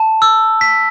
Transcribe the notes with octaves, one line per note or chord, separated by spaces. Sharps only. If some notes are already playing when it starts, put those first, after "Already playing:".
Already playing: A5
E6
B6